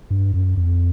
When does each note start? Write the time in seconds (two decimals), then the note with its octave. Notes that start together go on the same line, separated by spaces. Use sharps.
0.11 G2
0.34 F#2
0.57 F2